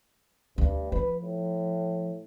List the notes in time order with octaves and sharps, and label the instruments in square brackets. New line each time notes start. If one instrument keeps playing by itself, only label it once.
[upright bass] D2 [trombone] G2
[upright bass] F3 [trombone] B4
[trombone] A2